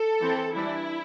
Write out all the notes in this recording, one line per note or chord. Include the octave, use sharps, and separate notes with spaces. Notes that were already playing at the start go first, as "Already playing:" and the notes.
Already playing: A4
E3 C4
E3 G3 D4 E4